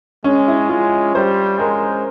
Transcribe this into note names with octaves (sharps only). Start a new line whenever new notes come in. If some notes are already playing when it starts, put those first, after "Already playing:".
G#3 C#4
E4
G#3 F4
G3 C5
G#3 A#4